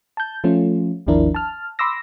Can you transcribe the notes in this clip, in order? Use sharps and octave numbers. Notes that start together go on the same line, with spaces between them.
A5 G6
F3 A3 C#4 F4
G#1 D#2 F3 D4 E4 A#4
A5 F6
B5 C6 D6 E6 A#6